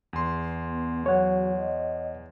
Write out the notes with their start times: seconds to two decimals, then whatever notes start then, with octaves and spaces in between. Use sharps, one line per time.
0.13 E2 C6
0.67 B3
1.06 F#3 C#5 F#5
1.57 D#5